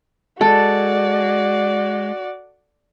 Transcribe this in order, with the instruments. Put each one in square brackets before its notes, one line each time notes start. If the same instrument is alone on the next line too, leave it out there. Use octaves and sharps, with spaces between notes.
[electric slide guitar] G#3 [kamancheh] F#4 D5 [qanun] A4